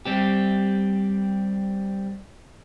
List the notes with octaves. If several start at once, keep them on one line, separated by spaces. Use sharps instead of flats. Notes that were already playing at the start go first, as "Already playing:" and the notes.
G3 C4 G4